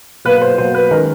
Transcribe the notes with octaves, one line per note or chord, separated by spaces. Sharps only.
B2 F#3 A#3 B4
C5
B2 F#3 A#3 C5
B4
D#3 G#3 C#4 A#4